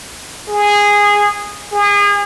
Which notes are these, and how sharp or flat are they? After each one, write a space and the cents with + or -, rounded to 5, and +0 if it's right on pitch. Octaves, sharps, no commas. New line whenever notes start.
G#4 -15
G#4 -35